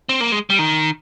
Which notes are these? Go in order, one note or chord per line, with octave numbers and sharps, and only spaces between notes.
C4
A#3
G#3
G3
D#3